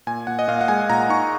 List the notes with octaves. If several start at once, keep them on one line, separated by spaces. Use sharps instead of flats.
A#2 G#5
A#2 F#5
D#5
A#2 F5
F#5
G#3 G#5
A#2 A#5
D#4 C#6